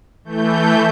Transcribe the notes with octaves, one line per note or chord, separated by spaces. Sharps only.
E3 A3 G6